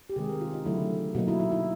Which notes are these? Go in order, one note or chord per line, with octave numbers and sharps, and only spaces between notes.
G4
C3 D#3 G#3 G#4
A#4
F4
D#4
D3 F#3 A3 E4
B2 F#3 A#3 D#4
E4
E4
E4